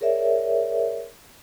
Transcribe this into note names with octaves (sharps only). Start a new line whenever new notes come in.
G#4 A#4 C#5 D5 E5